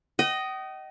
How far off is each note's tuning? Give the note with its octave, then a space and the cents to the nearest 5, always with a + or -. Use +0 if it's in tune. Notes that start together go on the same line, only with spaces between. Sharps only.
D#5 +0 G5 -45